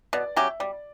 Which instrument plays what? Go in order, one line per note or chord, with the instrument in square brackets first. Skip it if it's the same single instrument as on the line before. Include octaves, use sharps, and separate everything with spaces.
[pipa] B2 [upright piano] D5
[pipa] F#3 C#4 G4 [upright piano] E5
[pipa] G3 [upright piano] D5